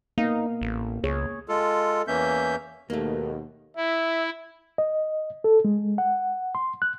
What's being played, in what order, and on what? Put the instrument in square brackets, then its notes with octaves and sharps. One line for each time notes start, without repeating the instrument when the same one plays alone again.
[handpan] A#3 B3 F5 [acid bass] D#4
[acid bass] A1
[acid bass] C#2 [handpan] G#4 C#5
[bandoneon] G#3 F4 A4
E2 E3 A#3 C#4 E5 G6
[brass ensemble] D#2 B2 [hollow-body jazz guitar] A3 A#3
[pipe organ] E4 [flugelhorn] E5
[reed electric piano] D#5
A4
G#3
F#5
C6
F#6